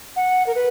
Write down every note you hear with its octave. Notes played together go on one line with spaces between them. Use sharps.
F#5
A#4
B4